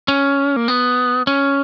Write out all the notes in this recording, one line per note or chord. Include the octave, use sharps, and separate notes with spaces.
C#4
A#3
B3
C#4